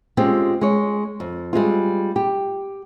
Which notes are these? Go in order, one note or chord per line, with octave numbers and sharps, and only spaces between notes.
G#3 C4 C#4 F4 G4
G#3 C#5
F2
G3 G#3 C4 F4
G4